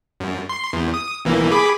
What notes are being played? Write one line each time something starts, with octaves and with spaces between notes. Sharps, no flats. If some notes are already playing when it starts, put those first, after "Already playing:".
F#2
C6
E2
D#6
B1 E3 A#3
G#4 B5 D6